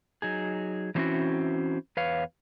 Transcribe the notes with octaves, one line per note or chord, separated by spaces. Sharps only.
F#3 D#4 G#4
E3 F#3 C4 C#4 E4 F#4
E2 B4 C#5 F5